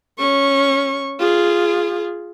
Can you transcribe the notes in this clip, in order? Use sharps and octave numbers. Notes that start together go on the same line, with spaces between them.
C#4 C#6
F4 G#4